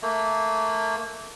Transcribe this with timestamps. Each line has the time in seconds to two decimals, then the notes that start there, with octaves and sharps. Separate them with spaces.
0.02 A3 A#3